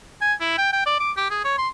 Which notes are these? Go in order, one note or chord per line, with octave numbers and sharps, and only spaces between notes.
G#5
E4
G5
G5
D5
D6
G4
G#4
C#5
C6